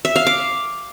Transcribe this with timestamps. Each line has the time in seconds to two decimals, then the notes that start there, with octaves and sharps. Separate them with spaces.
0.05 E5
0.16 F5
0.27 D6